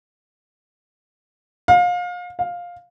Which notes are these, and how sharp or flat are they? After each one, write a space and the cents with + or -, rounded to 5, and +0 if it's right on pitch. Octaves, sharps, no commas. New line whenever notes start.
F5 +30
F5 +10